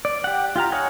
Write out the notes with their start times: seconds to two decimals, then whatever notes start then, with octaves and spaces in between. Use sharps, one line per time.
0.05 D5
0.24 G4 F#5
0.56 F4 G4 F5 A#5
0.72 C#5 D#5 F#5 G#5